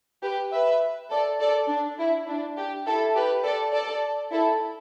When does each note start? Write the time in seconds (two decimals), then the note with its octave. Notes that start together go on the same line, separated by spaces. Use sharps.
0.23 G4 B4
0.52 B4 E5
1.10 A4 D5
1.40 A4 D5
1.69 D4
1.99 E4
2.28 D4
2.57 G4
2.86 E4 A4
3.15 G4 B4
3.44 A4 D5
3.73 A4 D5
4.32 E4 A4